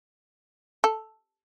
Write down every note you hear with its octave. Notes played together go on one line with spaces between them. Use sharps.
A4